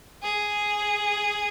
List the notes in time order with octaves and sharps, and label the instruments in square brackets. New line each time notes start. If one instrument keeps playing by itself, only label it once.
[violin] G#4